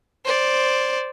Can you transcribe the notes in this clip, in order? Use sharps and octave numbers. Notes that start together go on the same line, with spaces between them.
C5 D5